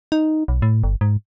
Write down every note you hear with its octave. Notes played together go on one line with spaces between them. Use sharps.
D#4
B1
A2
G1
G#2